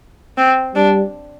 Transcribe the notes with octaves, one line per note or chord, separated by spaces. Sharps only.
C4
G3 D4